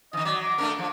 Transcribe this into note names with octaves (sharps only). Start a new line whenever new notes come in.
D#3 E3 D#5
F#3 D5
D6
A3 D4 A#4
F3